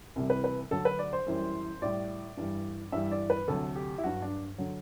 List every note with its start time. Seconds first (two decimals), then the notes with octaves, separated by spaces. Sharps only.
0.16 C2 C3 E3 G3
0.30 B4
0.44 B4
0.71 D2 D3 F#3 A4
0.85 B4
0.99 D5
1.13 C5
1.26 F#2 E3 G3
1.82 A2 G3 D5
2.37 G2 E3 G3
2.92 G2 E3 G3 E5
3.12 D5
3.30 B4
3.48 D2 C3 F#3 A4
3.76 G4
3.98 E4
4.04 G2 F#3 F#4
4.22 D4
4.58 D3 F#3